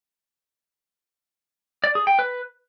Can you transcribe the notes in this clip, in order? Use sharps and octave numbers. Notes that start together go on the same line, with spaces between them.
D5
G#4
G5
B4